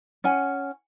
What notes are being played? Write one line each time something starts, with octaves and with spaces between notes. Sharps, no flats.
C#4 F#5 G#5